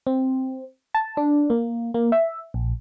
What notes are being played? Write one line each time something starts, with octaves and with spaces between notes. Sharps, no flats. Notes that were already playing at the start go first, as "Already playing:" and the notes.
C4
A5
D4
A#3
A#3
E5
A#1